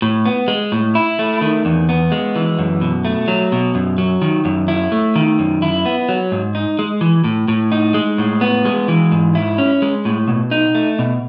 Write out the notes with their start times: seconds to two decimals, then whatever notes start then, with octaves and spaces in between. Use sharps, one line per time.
0.02 A2
0.26 B3
0.48 G#3
0.72 A2
0.95 E4
1.19 A3
1.41 D#3
1.65 E2
1.89 B3
2.12 G#3
2.36 E3
2.59 F#2
2.81 B2
3.05 A3
3.28 F#3
3.52 B2
3.75 F#2
3.98 F#3
4.22 D#3
4.45 F#2
4.68 E4
4.92 A3
5.15 D#3
5.39 F#2
5.62 E4
5.85 B3
6.09 F#3
6.32 G#2
6.55 D#4
6.79 G#3
7.01 E3
7.24 A2
7.48 A2
7.72 D#4
7.94 G#3
8.18 A2
8.41 B3
8.65 G#3
8.88 E3
9.12 G#2
9.35 E4
9.58 C#4
9.82 G#3
10.05 A2
10.28 B2
10.51 D#4
10.75 A3
10.99 B2